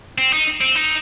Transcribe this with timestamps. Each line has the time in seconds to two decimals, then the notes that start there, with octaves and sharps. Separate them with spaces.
0.18 C4
0.33 D#4
0.61 C4
0.76 D#4